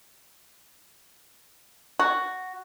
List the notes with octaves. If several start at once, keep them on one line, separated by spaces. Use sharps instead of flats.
F#4